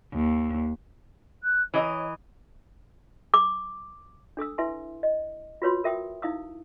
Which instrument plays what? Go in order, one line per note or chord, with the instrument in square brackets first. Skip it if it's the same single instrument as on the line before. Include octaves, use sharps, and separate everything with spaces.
[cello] D#2
[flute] F#6
[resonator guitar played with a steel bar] E3 D#5 A#5 [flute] C#5
[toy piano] D6
D4 A4 D#6 E6
E4 B4 E5 G#5 C6
D#5
F4 F#4 B4 C#5 B5 C6
A#4 E5 G5 D#6
D#4 E4 F5 D#6 E6